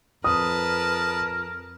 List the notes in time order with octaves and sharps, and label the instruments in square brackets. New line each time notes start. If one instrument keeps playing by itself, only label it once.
[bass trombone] F2 [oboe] A#4 [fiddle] B4 A5 [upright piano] D#6